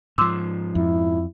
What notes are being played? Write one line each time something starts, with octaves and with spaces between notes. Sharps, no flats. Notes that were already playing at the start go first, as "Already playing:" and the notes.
G#2 F3 C6 D6 E6
F2 E4